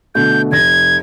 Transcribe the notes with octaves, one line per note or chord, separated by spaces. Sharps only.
B2 D3 A3 G6
F1 G#6 A#6